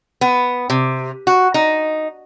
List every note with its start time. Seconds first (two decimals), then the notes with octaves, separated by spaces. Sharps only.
0.21 B3
0.70 C3
1.27 F#4
1.54 D#4